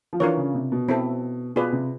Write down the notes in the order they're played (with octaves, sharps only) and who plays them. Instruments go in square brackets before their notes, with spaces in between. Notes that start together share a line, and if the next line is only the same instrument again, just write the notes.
[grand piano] F3
[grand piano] E3 [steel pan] D4 F4 A#4 C#5
[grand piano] C#3
C3
B2
[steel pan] C4 E4 A4
[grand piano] B2 [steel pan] F4 G#4 B4 D5
[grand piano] C3